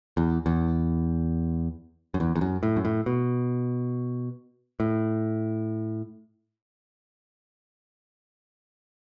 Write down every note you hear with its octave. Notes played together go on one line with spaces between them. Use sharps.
E2
E2
F#2
E2
E2
F#2
A2
F#2
A2
B2
A2